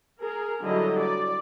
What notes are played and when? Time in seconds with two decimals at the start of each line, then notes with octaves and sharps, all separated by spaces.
0.21 G#4 A#4
0.63 D3 F#3 G3 E4 D#5
0.99 D5